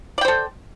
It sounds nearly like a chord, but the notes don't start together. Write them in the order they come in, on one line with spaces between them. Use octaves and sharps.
D5 G5 C5 A4